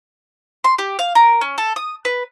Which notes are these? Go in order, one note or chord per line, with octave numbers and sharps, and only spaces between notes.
C6
G4
F5
A#4
C#4
A4
D#6
B4